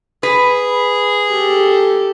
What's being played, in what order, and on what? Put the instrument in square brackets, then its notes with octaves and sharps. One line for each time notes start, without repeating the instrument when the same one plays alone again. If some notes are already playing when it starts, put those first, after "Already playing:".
[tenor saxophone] G#4 [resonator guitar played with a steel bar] B4
[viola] G4 A4